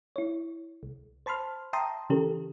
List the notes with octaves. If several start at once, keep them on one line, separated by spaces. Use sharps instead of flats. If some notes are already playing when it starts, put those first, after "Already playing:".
E4 C#5
C2
C5 A5 B5 C6 F6
E5 G5 A5 A#5 C6 D#6
C#3 E3 C#4 G4 A4 A#4